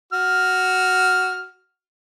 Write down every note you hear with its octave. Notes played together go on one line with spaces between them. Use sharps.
F#4 F6